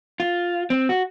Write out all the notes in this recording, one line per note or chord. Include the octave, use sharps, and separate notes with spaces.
F4
C4
F#4